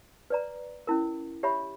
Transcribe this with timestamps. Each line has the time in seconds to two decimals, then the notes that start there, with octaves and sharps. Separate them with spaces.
0.30 B4 D5 A#5
0.87 C#4 E4 A#4
1.43 G4 C#5 E5 B5